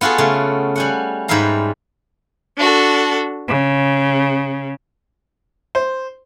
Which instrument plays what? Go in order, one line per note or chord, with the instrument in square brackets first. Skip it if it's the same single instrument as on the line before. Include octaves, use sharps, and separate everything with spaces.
[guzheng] B3 F4 F#4 G#4 A4
C#3 A3
G3 C#4 F#5
G#2 G3 B4 E5 F5 A#5
[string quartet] D4 F#4 A4
C#3
[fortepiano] C5